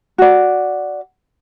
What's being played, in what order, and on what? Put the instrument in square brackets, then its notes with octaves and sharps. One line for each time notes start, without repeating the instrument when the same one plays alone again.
[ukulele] F#4 D5